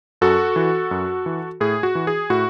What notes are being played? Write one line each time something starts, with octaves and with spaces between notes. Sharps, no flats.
F#2 F#4 A4
E3
F#2
E3
A2 G#4
F#4
E3
G#4
A2 F#4